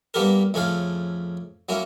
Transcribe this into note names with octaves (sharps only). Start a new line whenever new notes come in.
G2 A#3 B3 G4 A4 A#4
F2 A2 C#3 G#4 A4 F5
F#3 A#3 C#4 E4